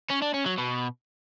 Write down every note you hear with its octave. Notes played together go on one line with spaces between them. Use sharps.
C#4
D4
C#4
F#3
B2